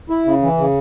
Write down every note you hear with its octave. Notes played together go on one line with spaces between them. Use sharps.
E4
C#3
E3
C#3